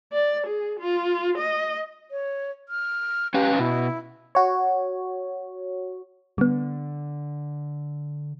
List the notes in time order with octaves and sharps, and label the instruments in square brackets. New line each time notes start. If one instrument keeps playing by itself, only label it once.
[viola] D5
G#4
F4
D#5
[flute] C#5
F6
[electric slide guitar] C#4 B4 F5 [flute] G4
[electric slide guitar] B2 [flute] E4
[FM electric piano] F#4 C#5
[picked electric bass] D3 [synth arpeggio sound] G3 B3